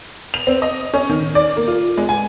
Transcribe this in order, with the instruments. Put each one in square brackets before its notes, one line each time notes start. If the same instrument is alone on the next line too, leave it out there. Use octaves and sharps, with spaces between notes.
[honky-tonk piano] F7
C4
D#5
C#4
D#3
D5
A#3
F4
G#3
G#5